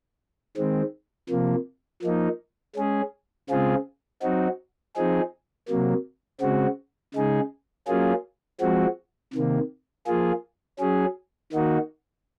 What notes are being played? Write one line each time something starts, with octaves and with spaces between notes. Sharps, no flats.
D#3 G#3 C4
C3 F3 A#3
F3 A#3 D#4
G#3 C#4 G#4
C#3 G#3 C4 F4 G#4
F#3 C4 D#4 F#4
F3 C4 D#4 G#4
C3 F#3 A#3
C#3 G#3 C4 F#4
C#3 G#3 D#4 G#4
F#3 A#3 C#4 F4 G#4
F3 G#3 C4 F#4
C3 D#3 A#3
F3 A#3 F4 G#4
F#3 C#4 G#4
D#3 A#3 D#4 F#4